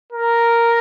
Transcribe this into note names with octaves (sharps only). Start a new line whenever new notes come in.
A#4